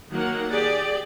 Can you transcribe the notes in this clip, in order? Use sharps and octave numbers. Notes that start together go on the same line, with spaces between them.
D#3 F#3 A#3 F#5
G4 G#4 D5